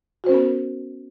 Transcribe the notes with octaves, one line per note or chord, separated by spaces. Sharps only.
B3 C#4 F#4 A#4 C5